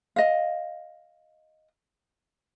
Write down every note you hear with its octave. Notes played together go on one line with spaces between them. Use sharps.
D#5 F5